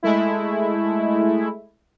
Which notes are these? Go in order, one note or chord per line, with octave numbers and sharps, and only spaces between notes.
G#3 A3 E4